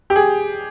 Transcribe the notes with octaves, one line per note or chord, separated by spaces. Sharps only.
G4
G#4